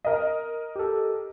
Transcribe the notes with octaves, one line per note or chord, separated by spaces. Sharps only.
A#4 D#5
G4 A4